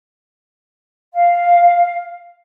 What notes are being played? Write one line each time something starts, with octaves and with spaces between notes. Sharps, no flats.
F5